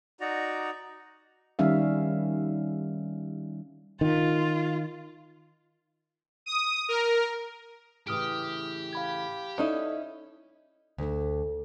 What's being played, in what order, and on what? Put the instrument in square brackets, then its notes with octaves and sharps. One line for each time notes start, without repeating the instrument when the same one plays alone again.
[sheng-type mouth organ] D#4 F#4 D5 A#5
[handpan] D#3 G3 C#4 E5 F5
[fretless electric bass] D#3 [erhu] F4
[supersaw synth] D#6
A#4
[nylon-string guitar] A2 C#3 E3 [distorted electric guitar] G4 [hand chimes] D#6 F6 D7
[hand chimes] F5 B5 G#6
[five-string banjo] C#4 D#4 E4 [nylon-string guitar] A4 D5 D#5
[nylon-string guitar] D2